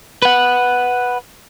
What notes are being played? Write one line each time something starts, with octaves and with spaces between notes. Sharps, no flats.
B4 F#5